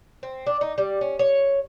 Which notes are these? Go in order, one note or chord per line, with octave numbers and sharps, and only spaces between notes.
C4
D4
D#4
G3
C#4
C#5